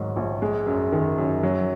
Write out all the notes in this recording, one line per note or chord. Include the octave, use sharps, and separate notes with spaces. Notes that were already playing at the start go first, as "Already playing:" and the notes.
Already playing: G#2 D#3 F#3
A#1
G#3
F#2
D#3
F#2
F#3